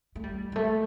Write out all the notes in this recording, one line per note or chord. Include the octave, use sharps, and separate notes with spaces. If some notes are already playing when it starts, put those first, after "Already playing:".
A3
G3
G3
A3